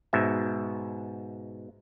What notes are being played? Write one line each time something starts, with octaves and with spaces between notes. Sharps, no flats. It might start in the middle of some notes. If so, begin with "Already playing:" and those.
G#2 B2 E5